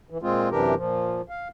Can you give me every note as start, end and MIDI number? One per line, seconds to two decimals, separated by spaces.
0.10 0.18 52
0.22 0.49 46
0.22 0.49 56
0.22 0.49 60
0.22 0.49 65
0.51 0.75 42
0.51 0.75 48
0.51 0.75 52
0.51 0.75 62
0.51 0.75 67
0.51 0.75 70
0.76 1.21 46
0.76 1.21 53
1.29 1.48 77